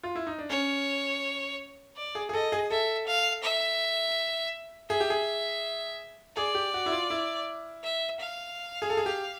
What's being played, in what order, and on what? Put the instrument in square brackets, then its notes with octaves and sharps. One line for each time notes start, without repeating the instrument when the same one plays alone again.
[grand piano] F4
E4
D#4
D4
[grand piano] C#4 [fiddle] C#5
[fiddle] D5
[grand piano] G#4
G#4
[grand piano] A4 [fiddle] D#5
[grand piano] G#4
[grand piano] A4 [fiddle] E5
[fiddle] F5
E5
[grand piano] G#4 [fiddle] E5
[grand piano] G4
G#4
[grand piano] G#4 [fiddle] D5
[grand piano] G4
F#4
E4
F4
E4
[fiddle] E5
F5
[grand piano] G#4
A4
G#4
G4